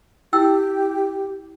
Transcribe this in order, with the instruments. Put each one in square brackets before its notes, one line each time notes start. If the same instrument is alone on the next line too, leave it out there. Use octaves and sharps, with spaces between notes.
[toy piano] E4 G5 E6 [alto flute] G4